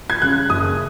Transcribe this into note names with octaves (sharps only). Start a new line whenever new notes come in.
G#6
C#3 F#6
F#1 D#6